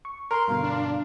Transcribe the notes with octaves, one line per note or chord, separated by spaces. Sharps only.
C#6
A#4 C6
G2 B2 D3 F5
D4